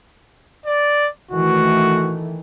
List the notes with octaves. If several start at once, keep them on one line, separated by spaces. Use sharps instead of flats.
D5
D#3 E3 A3 F#4